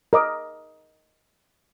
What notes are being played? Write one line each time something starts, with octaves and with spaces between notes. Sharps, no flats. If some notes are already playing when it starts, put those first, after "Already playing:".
A#4 D#5 D6